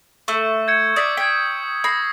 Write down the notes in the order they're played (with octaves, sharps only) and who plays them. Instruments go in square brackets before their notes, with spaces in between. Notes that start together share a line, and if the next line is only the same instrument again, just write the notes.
[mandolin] A3 [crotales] C#6 E6
[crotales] G6 G#6 C#7
[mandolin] D5 [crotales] D#6 B6
[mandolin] G5 [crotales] G#6 B6
[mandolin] B5 [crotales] D#6 A#6 C7